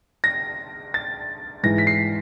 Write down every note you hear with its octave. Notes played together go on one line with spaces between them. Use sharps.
A#6
A6
G#2 E3 A#6
B6
C7